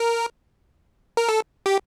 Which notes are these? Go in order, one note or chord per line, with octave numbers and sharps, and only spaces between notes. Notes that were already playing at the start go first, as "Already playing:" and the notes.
Already playing: A#4
A#4
A4
G4